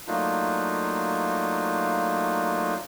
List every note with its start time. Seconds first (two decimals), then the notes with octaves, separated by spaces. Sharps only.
0.07 F#3 A3 A#3 D4 D#4 F4